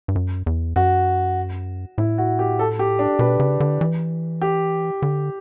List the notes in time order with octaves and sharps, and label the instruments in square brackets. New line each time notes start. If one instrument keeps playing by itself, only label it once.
[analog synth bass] G2
F#2
E2
[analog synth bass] F#2 [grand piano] F#4
[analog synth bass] A2 [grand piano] E4
[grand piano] F#4
G4
A4
G4
D4
[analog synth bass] B2 [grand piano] B4
[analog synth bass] C#3
D3
E3
[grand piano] G4
[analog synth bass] D3